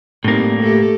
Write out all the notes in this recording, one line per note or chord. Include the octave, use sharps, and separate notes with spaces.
A2 G3 A#3 C4 D#4
A3 G4 A4